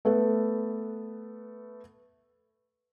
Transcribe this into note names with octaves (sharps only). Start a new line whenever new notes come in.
A3 B3 A4 B4